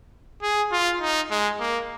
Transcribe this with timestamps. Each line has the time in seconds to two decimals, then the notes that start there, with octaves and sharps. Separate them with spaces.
0.42 G#4
0.71 F4
1.01 D#4
1.30 G#3
1.60 A#3